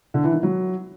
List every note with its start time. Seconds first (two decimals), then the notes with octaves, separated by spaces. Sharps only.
0.14 D3
0.24 E3
0.33 D#3
0.43 F#3